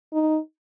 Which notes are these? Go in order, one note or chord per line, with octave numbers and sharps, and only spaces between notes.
D#4